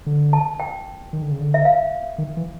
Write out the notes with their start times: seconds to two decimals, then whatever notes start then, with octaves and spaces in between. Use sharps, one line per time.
0.06 D3
0.33 A5
0.60 G5
1.13 D#3
1.22 D3
1.32 C#3
1.40 D3
1.54 E5
1.65 F5
2.18 D#3
2.37 E3